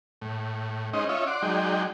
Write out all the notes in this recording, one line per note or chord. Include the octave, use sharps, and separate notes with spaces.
A2
G#3 C#4 D#4 C5 D#5
C#4 F4 C#5 D#5 E5
D5 F#5 C6 D6
F#3 G#3 D#4 D5 G5